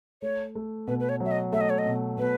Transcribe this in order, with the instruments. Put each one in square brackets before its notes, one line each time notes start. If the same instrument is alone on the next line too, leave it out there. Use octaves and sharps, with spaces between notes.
[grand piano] A3 [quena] C#5
[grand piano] A3
[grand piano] B2 [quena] B4
[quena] B4
C#5
[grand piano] F#3 [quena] E5
[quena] D#5
[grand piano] A3 [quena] E5
[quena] D#5
C#5
D#5
[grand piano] B2
[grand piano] B2 [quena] B4